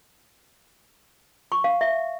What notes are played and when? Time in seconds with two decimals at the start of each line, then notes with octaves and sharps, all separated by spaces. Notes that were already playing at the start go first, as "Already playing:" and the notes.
1.52 C#6
1.64 F5
1.81 E5